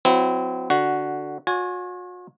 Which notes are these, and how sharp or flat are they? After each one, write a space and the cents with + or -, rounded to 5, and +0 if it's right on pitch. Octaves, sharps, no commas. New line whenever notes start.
F#3 -20 C4 -30 E4 +0
D3 +0 F#4 +0
F#4 -45 C#5 +35 G#5 +0